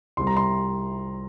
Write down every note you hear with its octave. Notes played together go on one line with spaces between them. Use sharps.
C2 C3 G3 C6
A#5
C6